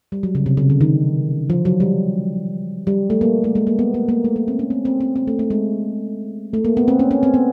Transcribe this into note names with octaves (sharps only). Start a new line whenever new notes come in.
G3
F#3
C#3
C3
C#3
D3
D#3
F3
F#3
G3
G3
A3
A#3
A3
G#3
A#3
B3
A#3
A#3
A3
A#3
C4
C#4
C4
C4
C4
C4
A3
A3
G#3
A3
A#3
B3
C4
C#4
C#4
C4
B3